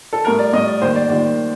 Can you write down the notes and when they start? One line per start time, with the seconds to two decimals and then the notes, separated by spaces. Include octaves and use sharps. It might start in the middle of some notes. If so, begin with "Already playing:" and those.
0.13 A4
0.25 A2 G3 A#4
0.39 D5
0.53 A2 G3 D#5
0.68 D5
0.82 D#2 D#3 G3 C5
0.96 D5
1.09 D#2 D#3 G3 D5